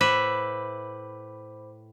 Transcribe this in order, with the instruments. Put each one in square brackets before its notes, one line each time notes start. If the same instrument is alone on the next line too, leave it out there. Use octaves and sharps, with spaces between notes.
[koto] A2 B4 E5 [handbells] C5 B5 D6